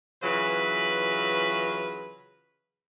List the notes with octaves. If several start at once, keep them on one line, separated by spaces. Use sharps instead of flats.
C#3 E3 F#3 F4 B4